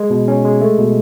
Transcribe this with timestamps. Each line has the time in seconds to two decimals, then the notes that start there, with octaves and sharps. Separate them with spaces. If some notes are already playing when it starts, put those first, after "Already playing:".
Already playing: G#3
0.10 B2
0.28 C#4
0.45 G#3
0.61 A3
0.78 B2